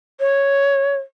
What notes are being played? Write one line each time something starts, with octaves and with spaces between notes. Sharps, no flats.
C#5